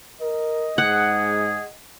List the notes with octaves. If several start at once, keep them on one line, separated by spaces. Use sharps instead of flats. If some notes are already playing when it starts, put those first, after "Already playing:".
A#4 D#5
G#2 G#4 F#5